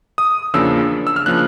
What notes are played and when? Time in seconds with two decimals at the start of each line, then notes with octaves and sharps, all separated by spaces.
0.18 D#6
0.54 E2 C#3 F3 A#3 D4 E6
1.07 E6
1.16 F6
1.26 C#3 F3 A#3 D4 F#6